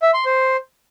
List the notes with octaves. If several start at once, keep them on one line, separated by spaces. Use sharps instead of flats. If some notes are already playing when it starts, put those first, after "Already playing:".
E5
C6
C5